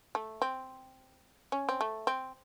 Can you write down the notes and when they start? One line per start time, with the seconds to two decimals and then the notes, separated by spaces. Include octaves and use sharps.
0.15 A3
0.42 C4
1.52 C#4
1.69 C4
1.81 A3
2.07 C4